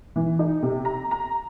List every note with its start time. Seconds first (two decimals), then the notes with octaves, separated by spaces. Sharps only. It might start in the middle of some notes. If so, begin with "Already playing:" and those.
0.16 E3
0.39 D#4
0.62 C3
0.85 A#5
1.11 A#5